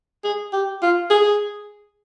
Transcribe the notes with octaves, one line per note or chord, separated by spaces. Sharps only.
G#4
G4
F4
G#4